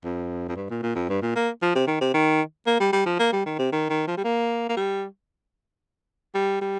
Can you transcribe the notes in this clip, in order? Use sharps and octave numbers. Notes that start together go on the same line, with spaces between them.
F2
F2
G2
A#2
A#2
F2
G2
A#2
A#3
F3
C3
D#3
C3
D#3
A#3
G3
G3
F3
A#3
G3
D#3
C3
D#3
D#3
F3
G3
A#3
A#3
G3
G3
G3